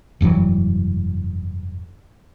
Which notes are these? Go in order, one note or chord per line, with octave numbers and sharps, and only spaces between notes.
F1 G2 E3 F#3